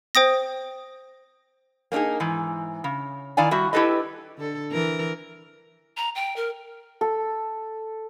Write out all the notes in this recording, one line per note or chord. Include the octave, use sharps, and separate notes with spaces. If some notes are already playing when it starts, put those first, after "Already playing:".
C5 G5 D#6 A#6
A#3 C4 D4 D#4 G#4
G#2 E3
C#3
D#3 E4 D5 F5 G#5
G3 F#4 E5
E4 G4 A4 B4 D#5
D3 A4
E3 A#4
A#5
G5
A#4
A4